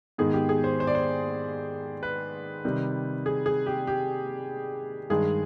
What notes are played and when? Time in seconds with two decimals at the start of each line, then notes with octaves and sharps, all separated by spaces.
0.18 G#2 D#3 B3 G#4
0.33 G4
0.49 G#4
0.64 C5
0.80 C5
0.87 D5
0.95 C5
2.03 B4
2.65 C3 D#3 G3
3.26 G#4
3.46 G#4
3.66 G4
3.87 G4
5.10 G2 D#3 G#3 G#4